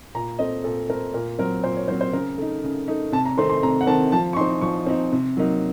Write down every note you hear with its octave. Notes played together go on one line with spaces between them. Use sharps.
A#2 A#5
A3 C4 D#5
A#2 A4
A3 C4 A#4
A#2 A#4
F#3 C4 A#4
A#2 C5
C#5
F#3 C4 C5
C5
C#3 A#4
A3 D#4
C#3
A3 D#4
C3 A5
A#5
D#3 A3 C4 C6
C6
C3 A#5
F#5
D#3 A3 C4 A5
F3 A5
C#6
C4 D#4 C6
F3 C#6
C4 D#4
C3
F#3 A#3 D#4